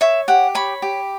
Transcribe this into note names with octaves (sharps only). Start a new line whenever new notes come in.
C#5 E5
G4 F#5
C#5 B5
G4